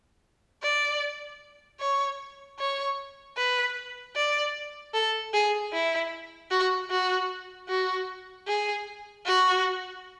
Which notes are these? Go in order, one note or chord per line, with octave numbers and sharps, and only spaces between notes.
D5
C#5
C#5
B4
D5
A4
G#4
E4
F#4
F#4
F#4
G#4
F#4